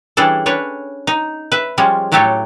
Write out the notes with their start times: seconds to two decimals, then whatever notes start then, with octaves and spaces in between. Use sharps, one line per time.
0.17 E3 G3 C#4 D4 G#4 A4
0.46 C#4 D4 B4 C#5
1.07 D#4
1.52 B4 E5
1.78 F3 G3 G#3 C#4
2.12 A2 F#3 A3 G4 A4 C#5